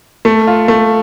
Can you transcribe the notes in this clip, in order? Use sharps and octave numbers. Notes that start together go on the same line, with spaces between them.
A3
F4
A3